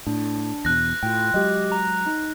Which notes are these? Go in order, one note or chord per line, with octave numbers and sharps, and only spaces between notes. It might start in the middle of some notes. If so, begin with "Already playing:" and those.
A2 D4
E2 B2 F#6 A#6
A2 F4 G5
F#3 G#3 G4 D#5
A#5
D#4